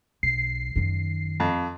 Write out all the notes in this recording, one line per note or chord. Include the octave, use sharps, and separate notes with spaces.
B1 C7
F#2 D#3
F2